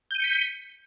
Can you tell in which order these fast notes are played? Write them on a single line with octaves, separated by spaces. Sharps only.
G6 D#7 C#7 B6